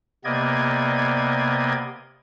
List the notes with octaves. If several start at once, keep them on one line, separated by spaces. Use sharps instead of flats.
C3 A#3 B3 D5 D#5 G#6